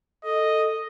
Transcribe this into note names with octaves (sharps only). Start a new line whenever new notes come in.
A4 D#5